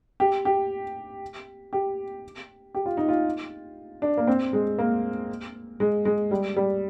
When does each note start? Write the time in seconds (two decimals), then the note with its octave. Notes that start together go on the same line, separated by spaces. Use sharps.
0.20 G4
0.45 G4
1.73 G4
2.75 G4
2.86 F4
2.97 D#4
3.09 F4
4.02 D4
4.17 A#3
4.27 C4
4.53 G#3
4.79 A#3
5.80 G#3
6.05 G#3
6.31 G3
6.57 G3